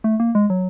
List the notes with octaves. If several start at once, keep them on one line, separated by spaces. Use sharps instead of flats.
A3
A#3
G#3
F#3